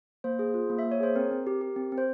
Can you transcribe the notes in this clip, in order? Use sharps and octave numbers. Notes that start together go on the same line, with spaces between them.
A#3 C5
G#4
F4
A#3
E5
A#3
C#5
G#4 C5
C4 A#4
C4
G4
G4
C4
C4
C5